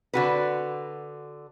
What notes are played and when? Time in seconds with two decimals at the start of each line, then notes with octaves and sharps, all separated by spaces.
0.14 D3 F#4 B4